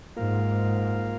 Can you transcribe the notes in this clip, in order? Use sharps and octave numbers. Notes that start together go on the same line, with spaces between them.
G#2 A#3 F4 A#4 F5